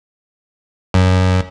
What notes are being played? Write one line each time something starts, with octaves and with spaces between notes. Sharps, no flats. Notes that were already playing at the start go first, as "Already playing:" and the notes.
F#2